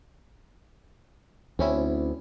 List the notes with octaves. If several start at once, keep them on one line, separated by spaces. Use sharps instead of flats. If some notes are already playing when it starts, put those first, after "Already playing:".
D2 C4 C#4 E4